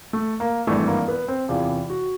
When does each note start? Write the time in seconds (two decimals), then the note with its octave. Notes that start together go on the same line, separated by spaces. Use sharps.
0.13 A3
0.40 A#3
0.67 G#1 G2 E3 A3
0.87 A#3
1.08 B3
1.28 C4
1.49 E2 C3 E3 F4
1.90 F#4